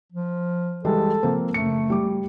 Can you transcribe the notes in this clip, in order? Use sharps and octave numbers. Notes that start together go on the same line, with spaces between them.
F3
E3 G3 G#3 A4
F3 A#3 C4
F#1 A3 C#7
G3 D6